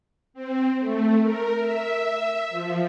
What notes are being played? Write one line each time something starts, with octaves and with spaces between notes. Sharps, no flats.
C4
A3
A#4
E5
F3